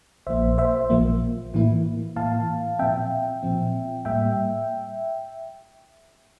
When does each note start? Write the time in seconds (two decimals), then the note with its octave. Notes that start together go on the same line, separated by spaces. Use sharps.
0.27 A#1 A#2 F3 A#3 C5 E5
0.58 C5 E5
0.90 A#1 A#2 F3 A#3
1.54 A2 E3 A#3 E4
2.16 A2 E3 A#3 E4 F5 A5
2.79 A#2 F3 C4 E5 G5
3.43 A#2 F3 C4
4.05 A2 G3 A#3 E5 G5